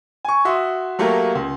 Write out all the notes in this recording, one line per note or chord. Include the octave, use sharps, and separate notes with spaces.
G#5 C#6
F#4 E5 C6 D#6
F#3 A3 A#3 G4 A#4 C#5
C#2